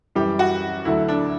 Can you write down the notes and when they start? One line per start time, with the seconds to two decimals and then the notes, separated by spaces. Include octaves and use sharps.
0.15 F#2 E3 G3 G4
0.39 F#4
0.85 D2 D3 F#3 E4
1.08 D4